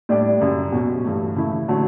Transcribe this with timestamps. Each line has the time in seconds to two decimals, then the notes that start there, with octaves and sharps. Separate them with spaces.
0.09 A2 G3 D4 G4 D5
0.41 F#2 C#3 G3
0.72 B2 F#3 C#4 F#4
1.04 G2 E3 A3
1.36 C#3 E3 A3 E4
1.68 D3 F#3 A3